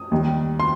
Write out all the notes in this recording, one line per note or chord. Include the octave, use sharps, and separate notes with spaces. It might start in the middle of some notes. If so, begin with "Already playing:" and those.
Already playing: D#6
D#2 D#3 G3
C6